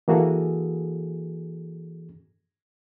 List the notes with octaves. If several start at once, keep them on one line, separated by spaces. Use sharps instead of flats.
E3 A#3 F#4 G#4 A4